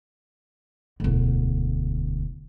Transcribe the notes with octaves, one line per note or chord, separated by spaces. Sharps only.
E1 D2